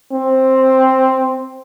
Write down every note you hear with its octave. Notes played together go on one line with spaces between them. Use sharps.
C4